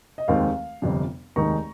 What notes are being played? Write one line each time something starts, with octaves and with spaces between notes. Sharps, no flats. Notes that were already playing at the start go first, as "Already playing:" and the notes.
D#5
F1 D#2 D#3 G#3 C4 F5
G1 F2 C3
F1 D#2 D#3 G#3 D#4 A#5 C#6